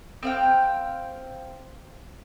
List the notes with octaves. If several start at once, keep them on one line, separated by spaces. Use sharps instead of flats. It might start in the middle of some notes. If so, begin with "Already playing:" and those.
C4 F5 G5